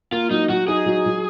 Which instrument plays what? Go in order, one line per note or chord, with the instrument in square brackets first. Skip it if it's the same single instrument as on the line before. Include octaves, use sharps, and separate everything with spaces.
[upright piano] A#3 [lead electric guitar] F4
[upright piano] F#3 [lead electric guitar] D#4
[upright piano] F#3 [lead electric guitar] F#4
[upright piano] D#4 [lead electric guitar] G#4
[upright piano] F#3
F#3